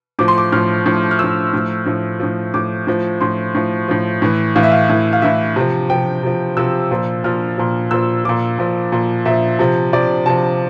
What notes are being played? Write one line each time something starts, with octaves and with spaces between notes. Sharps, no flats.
A2 F3 D6
C6
D6
A2 F3 F6
A2 F3
F6
A2 F3 E6
A2 F3
A2 F3
A2 F3
A2 F3 D6
A2 F3
A2 F3 C6
A2 F3
A2 F3
A2 E3
A2 E3 F5
E5
F5
A2 E3
F5
A2 E3 E5
C3 F3
C3 F3 G5
C3 F3
C3 F3 E6
A#2 F3
A#2 F3 F6
A#2 F3
A#2 F3 E6
A#2 F3 D6
A#2 F3
A#2 F3
A#2 F3 E5
C3 F3
C3 F3 D5
C3 F3 A5